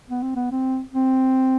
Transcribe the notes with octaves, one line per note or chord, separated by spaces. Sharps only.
B3
C4
B3
C4
C4